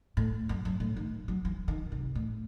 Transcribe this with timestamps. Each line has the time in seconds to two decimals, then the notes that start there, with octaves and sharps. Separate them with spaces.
0.17 A2
0.49 F#2
0.65 F#2
0.80 A2
0.96 D#3
1.28 F#3
1.45 E3
1.68 D#3
1.92 C3
2.15 A2